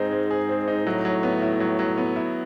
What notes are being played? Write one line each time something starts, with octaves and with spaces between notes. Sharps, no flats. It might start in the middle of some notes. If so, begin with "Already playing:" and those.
Already playing: G#2 G#3 C4 D#4 G#4
G#3
G#4
C4
D#4
A2 F#3
F#3
B3
E4
F#3
F#3
B3
E4